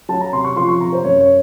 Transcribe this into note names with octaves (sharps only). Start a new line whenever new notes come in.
F#3 A5
A#5
C3 C6
C#6
F3 C6
C#6
C3 A#5
C5
F#2 C#5
C#5